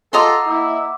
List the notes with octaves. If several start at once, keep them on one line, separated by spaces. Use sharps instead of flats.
F4 A4 D#5 F#5 A#5 C6 D6 E6
A#3 E4